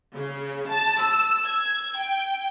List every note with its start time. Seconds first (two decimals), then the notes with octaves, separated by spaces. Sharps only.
0.15 C#3
0.69 A5
1.00 E6
1.45 G#6
1.98 G5